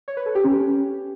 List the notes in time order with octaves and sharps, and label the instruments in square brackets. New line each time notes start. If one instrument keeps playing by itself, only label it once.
[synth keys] C#5
B4
A4
G4
C#4